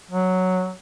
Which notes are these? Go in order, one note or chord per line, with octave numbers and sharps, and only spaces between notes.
F#3